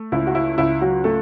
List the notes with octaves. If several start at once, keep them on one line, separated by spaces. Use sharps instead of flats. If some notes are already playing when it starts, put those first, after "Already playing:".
Already playing: A3
C#2 E4
F#4
E4
C#2 E4
F#3 F#4
A3 A4